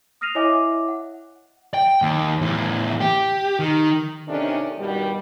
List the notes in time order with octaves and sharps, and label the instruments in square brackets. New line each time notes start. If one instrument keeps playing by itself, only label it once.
[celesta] D#6 F6 A#6 C7 D#7 F7
E4 C#5 D#5 E5 G#5 D6
F#5
[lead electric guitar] G5
D#2
E2 A2
G4
D#3
[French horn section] C3 D#3 A3 C#4 D4
G2 B2 D#3 G3